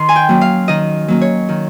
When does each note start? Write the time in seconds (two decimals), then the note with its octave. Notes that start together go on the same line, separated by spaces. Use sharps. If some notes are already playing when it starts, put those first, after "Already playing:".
Already playing: D#3 C6
0.09 G#5
0.16 G5
0.29 F#3 A#3 C#4
0.41 F5
0.68 D#3 D#5
1.08 F#3 A#3 C#4
1.21 C#5
1.49 D#3